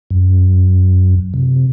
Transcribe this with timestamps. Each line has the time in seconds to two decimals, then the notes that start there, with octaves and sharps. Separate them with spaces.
0.10 F#2
1.34 C3